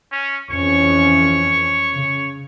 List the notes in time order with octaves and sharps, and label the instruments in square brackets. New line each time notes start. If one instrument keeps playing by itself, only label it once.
[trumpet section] C#4
[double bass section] F2 E3 C#4 [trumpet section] C#5 C#6
[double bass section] C#3